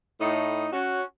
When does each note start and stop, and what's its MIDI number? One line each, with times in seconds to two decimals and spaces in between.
0.20 0.67 45
0.20 0.67 63
0.72 1.02 61
0.72 1.02 66